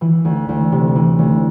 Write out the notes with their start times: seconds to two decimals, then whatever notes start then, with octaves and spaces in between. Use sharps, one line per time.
0.01 E3 E4
0.25 D2
0.49 D2
0.72 C3
0.95 E3
1.19 D2